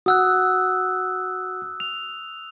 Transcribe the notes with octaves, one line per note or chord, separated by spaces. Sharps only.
F#4 F#5 D#6 E6 F#6
F7